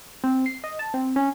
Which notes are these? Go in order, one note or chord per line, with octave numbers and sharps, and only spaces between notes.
C4
C7
D#5
A5
C4
C#4